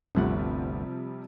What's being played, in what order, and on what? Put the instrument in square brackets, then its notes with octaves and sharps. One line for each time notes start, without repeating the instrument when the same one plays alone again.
[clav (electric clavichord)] G1 D2 F#5 [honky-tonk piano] C3 F3 G3